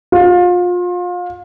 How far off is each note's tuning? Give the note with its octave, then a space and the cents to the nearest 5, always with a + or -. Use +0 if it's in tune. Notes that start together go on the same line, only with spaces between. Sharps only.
F4 +30